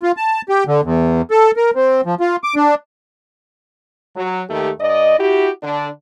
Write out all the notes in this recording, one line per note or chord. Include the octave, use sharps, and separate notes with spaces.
F4
A5
G4
D3
E2
A4
A#4
C4
F3
F4
D6
D4
F#3
D#2 D#3 A3 G4
G2 D5 D#5
E4 F#4 G4
D3 D4